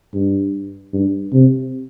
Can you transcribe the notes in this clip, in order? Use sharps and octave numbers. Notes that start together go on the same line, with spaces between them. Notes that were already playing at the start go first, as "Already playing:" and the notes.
G2
G2
C3